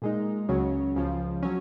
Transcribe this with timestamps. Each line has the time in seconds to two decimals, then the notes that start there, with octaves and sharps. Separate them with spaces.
0.02 A#2 G#3 D#4
0.49 C#2 C#3 F#3 C#4
0.96 C#2 C#3 F3
1.43 F#3 C#4